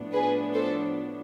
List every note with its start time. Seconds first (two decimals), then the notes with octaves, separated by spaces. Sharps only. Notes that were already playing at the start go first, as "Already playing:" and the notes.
Already playing: A2 F3 B3 D4
0.13 G#4 B4
0.54 A4 C5